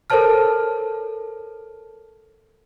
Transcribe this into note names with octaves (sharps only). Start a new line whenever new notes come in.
A4 A#4 C5 C#5 A5 F6